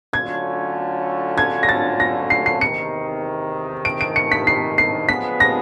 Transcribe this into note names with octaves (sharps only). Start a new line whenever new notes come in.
D3 F#3 A3 C#4 F4 G#6
G#6
A#6
A6
A#6
C7
C7
E2 C3 D#3 C#7
D7
D7
C#7
B6
C7
C7
C#3 F3 G#3 B3 B6
A#6